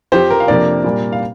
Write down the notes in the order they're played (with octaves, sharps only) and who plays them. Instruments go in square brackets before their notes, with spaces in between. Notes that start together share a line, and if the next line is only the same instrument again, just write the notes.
[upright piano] F2 F3 C4 G4 C5
A#4
F5
F2 C3 A#3 D4 A#4 D5
A#2 G3 A#3
F5